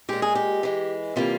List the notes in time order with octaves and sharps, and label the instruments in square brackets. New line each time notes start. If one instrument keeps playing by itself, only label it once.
[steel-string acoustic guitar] A#2 G#3 G4
G#4
G4
E3 G#3
C3 E3 G3 A#3 F4